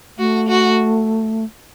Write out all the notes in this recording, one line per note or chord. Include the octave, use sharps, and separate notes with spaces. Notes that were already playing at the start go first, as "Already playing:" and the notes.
A3 F#4
F#4